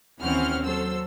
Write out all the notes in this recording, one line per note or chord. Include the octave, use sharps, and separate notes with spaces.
D#2 E3 C4 C#4 F#5 F6
F#3 A4 C5 E6